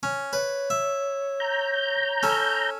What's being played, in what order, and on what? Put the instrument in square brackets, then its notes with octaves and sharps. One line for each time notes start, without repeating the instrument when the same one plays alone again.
[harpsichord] C#4
[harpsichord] B4 [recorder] C#5
[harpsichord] E5
[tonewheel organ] A#5 G6
[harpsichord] C#4 A4